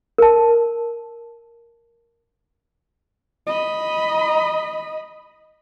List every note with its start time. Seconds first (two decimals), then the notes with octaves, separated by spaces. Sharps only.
0.18 A#4 A5
3.47 D#5 B5